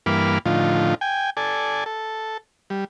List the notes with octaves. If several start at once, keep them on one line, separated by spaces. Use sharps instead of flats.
G2 E3 A#3 B5 D6 F6
A2 D3 F3 D#4 F4
G5 G#5
A4 D5 G#5
A4
G3